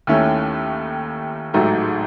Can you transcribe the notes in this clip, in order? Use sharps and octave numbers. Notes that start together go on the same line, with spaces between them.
D#2 D#3 A3 C#4 E4
A1 G#2 F#3 A3 D#4